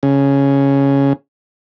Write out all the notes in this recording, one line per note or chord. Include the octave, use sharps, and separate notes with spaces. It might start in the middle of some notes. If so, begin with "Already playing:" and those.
C#3